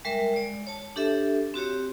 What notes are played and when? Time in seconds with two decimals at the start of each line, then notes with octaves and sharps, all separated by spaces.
0.05 G3 G#3 A#4 E5
0.34 G#3 D5
0.67 C#5 A5
0.96 D4 G4 A4 E5
1.54 C4 F#4 G4 C#5